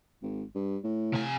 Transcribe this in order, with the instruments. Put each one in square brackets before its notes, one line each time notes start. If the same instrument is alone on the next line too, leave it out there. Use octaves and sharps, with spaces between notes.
[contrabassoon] G#1
G2
A2
[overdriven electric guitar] C3 G#5